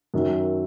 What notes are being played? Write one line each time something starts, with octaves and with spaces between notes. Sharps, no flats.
F#2 D#3 F#3